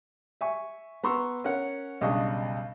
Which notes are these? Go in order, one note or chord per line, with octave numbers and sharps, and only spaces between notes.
E5 G#5 C#6
B3 A#5 C6 C#6 E6
C#4 A#4 F#5
B1 G2 C#3 D4 D#5 C#6